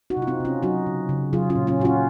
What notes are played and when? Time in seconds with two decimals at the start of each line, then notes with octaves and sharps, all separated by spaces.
0.10 D#4 F#4
0.17 C3
0.22 F4
0.27 C4 D#4
0.40 C3 C#4 F4
0.63 F#3 D#4 F#4
0.87 C#3
1.09 C#3
1.33 F#3 F4 G#4
1.50 C#4 F4
1.55 A#2
1.67 C#4 F4
1.80 A#2 F#4
1.85 C#4 F4